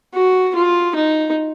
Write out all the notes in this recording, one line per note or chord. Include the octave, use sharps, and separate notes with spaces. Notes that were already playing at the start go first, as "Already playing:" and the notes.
F#4
F4
D#4